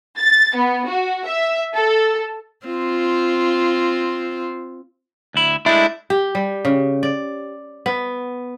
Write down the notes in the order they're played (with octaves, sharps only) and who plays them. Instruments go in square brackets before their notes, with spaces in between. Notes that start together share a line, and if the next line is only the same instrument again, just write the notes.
[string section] A6
B3
F#4
E5
A4
[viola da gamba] C4 F4
[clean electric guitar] D2 E4
[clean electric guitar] G#3 A3 D4 [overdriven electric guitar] E4
[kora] G4
G3
C#3
D5
B3